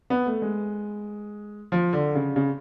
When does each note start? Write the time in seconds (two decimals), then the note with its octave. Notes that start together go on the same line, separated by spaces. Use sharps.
0.10 B3
0.26 A3
0.42 G#3
1.72 F3
1.93 D3
2.15 C#3
2.36 C#3